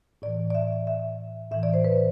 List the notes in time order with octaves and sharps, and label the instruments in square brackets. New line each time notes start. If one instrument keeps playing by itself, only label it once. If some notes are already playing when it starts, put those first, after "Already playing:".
[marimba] A2 E3 D5
D5
E5
E5
A2 E3 E5
D5
C5
B4